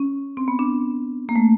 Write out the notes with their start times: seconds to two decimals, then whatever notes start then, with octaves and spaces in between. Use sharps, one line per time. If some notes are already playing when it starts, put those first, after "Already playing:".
Already playing: C#4
0.37 C4
0.48 B3
0.59 D4
1.29 A#3
1.36 A3